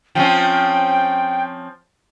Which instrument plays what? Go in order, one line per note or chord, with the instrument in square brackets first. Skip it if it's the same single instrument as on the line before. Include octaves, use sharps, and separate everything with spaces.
[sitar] F3 C4 C#4 [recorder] G5